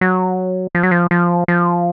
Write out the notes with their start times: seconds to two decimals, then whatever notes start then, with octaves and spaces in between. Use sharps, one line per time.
0.01 F#3
0.75 F3
0.83 F#3
0.91 F3
1.11 F3
1.48 F3